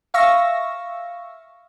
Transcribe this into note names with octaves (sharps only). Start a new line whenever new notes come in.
E5 F5 C#6 E6 A#6